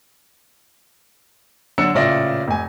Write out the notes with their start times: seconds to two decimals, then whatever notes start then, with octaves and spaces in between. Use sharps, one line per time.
1.78 D3 F#3 D4 E6 C#7
1.94 A1 A#2 C#3 D5 E5 A#6
2.48 F1 G#5